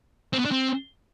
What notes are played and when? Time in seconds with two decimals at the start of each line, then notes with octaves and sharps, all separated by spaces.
0.33 C4
0.39 B3
0.45 D4
0.51 C4